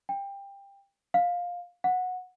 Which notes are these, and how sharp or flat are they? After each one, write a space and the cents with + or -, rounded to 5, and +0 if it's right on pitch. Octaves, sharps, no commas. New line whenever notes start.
G5 +20
F5 +15
F#5 -15